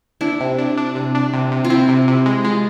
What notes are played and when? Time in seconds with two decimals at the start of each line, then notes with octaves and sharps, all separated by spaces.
0.21 D4 E4
0.40 C3
0.58 D4
0.77 D4
0.95 C3
1.15 D4
1.33 C3
1.51 C3
1.65 F4
1.70 C4 E4
1.89 C3
2.08 C3
2.26 G#3
2.44 G#3 F4